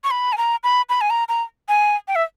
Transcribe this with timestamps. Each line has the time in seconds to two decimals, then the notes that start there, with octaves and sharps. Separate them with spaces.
0.04 C#6
0.11 B5
0.33 G#5
0.38 A#5
0.64 B5
0.89 B5
1.01 G#5
1.10 A#5
1.29 A#5
1.69 G#5
2.08 G5
2.16 E5